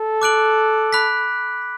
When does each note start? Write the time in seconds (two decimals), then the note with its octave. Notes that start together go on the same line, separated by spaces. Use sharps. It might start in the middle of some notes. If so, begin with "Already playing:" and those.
Already playing: A4
0.22 D6 F#6 D7 F#7
0.93 B5 F#6 B6